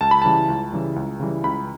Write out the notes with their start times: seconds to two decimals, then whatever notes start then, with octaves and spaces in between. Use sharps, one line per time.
0.01 C#2 A5
0.11 B5
0.22 C#3 E3 G3 A5
0.49 C#2
0.73 C#3 E3 G3
0.96 C#2
1.20 C#3 E3 G3
1.44 C#2 B5